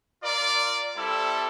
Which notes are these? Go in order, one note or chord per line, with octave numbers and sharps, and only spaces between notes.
F4 A#4 D5
G3 C4 E4 A4